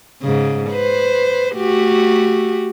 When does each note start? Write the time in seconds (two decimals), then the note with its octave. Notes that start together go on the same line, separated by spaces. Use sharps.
0.22 G#2 C#3
0.71 B4 C5
1.56 A3 F#4 G4